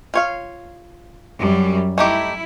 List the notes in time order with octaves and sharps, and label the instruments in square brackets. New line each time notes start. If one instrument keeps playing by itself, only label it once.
[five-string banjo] F4 C#5 F5
[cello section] F#2 G3
[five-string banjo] A3 D#4 G4 [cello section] E4